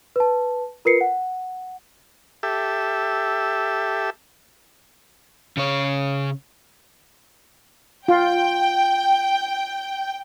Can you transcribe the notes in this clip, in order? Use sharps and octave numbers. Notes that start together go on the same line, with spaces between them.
B4 A5
F4 A#4 B4 C7 C#7
F#5
G4 A4 E5
C#3 C#5
F4 G5